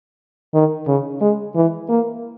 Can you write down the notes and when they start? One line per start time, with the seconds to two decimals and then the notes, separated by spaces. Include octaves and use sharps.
0.54 D#3
0.87 C#3
1.21 G#3
1.55 E3
1.89 A#3